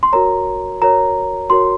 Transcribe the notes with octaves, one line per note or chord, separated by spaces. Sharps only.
C6
F#4 A#4 C#5 A#5
F#4 A#4 C#5 A#5
F#4 A#4 C#5 C6